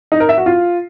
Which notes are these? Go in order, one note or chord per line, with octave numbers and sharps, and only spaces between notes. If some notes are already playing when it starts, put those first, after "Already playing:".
D#4
A#4
E5
F#4
F4